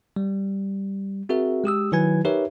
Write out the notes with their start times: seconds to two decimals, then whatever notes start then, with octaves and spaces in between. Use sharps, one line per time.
0.16 G3
1.29 C4 F#4 G#4 A#4 E5
1.64 G#3 G4 D#6 E6
1.92 D#3 F#3 E4 B4 G#5 G#6
2.25 D#4 G4 A#4 B4 C#5 E5